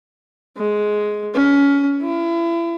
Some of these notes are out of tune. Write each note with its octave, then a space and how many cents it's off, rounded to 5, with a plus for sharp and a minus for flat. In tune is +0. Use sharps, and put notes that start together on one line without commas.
G#3 +10
C#4 +25
E4 +35